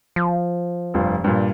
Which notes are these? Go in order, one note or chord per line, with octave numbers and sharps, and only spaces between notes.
F3
F1 G2 F4
G2 A#2